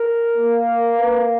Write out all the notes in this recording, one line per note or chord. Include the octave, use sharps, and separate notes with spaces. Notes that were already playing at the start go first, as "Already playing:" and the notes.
Already playing: A#4
A#3
B4